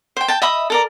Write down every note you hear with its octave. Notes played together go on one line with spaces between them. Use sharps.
C5 G5
G5 A5
D#5 E5 B5 D#6
A4 A#4 D5